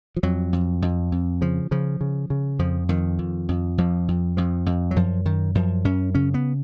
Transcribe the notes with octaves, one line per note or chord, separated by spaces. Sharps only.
F3
F2 F#3
F2
F2
F2
C#3 F3
C#3 F3
C#3
C#3
F2 F3
F2 D#3
F2
F2
F2 F3
F2
F2 F3
F2
F#3
F#2 F3
F#2 D#3
F#2 F3
F#2 C#4
C#3 C#4
B3